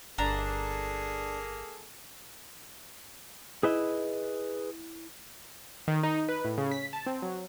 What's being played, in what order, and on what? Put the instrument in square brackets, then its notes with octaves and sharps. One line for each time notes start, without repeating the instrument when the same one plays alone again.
[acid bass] G1 [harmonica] A#3 G#4 A4 [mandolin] D4 A#5
[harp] E4 [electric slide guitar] G#4 B4 D#5
[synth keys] D#3
D#4
B4
A2
C#3
B6
A5
C4
F#3